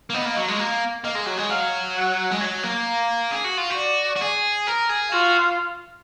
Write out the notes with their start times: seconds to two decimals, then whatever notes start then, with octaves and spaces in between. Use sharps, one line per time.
0.10 A#3
0.14 B3 D#5
0.25 A#3
0.37 F#3
0.48 G#3
0.59 A#3
1.04 A#3 D#5
1.15 G#3
1.26 F#3
1.38 G#3
1.50 F#3 F5
1.95 F#5
2.31 G#3
2.41 F#3
2.63 A#3
3.31 G#4
3.44 F#4
3.57 F4
3.70 F#4
3.77 D5
4.16 F#4
4.22 G#4
4.67 A#4
4.90 G#4
5.12 F4 F#4